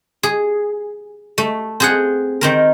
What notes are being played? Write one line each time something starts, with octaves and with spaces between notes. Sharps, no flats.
G#4
A3
C4 G#4 F#5
D#3 C4 A#4